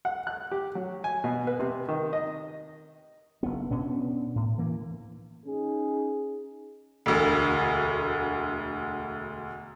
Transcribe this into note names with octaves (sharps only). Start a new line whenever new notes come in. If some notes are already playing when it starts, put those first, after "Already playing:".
F#5
F#6
G4
F#3
G#5
B2
B4
C3
D#3
D#5
F#1 B3
B2 B3 C#4 D4
A2
E3 A#3
C#4 D#4 G#4
E1 D2